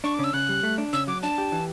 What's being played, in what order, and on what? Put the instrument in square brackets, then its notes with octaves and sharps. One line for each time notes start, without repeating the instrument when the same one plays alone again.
[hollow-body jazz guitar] D4 [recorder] C#6
[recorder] D6
[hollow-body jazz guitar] C#3
[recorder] E6
[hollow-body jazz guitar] C#3 [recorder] F#6
[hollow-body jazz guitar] G3
A3
D4
[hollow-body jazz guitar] C#3 [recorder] E6
[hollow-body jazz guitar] F#3 [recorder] D6
[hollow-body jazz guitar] D4 [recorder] A5
[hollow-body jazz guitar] G4
E3